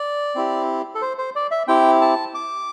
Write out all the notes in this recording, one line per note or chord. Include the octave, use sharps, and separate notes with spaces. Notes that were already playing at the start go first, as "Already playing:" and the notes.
Already playing: D5
C4 E4 G4
A4
C5
C5
D5
E5
C4 E4 G4 G5
A5
D6